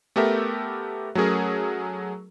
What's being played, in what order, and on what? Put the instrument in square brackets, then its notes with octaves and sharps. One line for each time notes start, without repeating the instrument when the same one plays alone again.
[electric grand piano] A3 B3 G4 A4 A#4 E5
F#3 A3 C#4 G#4 A#4